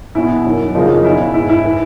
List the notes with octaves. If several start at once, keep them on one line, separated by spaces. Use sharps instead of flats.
E2 B2 E4
F#2 D#3
F#2 C#3 F3 D#4 F4
D#4
E2 B2 E4
G#2 E3 E4
E4
E3